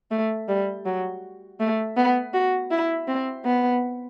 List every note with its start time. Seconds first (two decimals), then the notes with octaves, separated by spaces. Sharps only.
0.11 A3
0.48 G3
0.86 F#3
1.60 A3
1.97 B3
2.33 F#4
2.71 E4
3.08 C4
3.45 B3